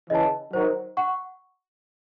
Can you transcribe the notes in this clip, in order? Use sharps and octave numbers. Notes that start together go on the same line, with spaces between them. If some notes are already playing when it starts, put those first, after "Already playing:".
C#3 E3 D#5 A5
D#3 F#3 C5
F#5 C#6